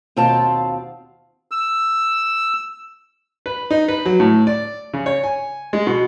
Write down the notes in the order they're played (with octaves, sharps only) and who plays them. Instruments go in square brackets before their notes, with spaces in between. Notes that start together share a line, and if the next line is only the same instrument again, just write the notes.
[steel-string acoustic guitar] D#2 B2 C4 F4 A5
[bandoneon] E6
[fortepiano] B4
D#4
B4
F#3
A2
D5
C#3
C#5
G#5
G#3
B2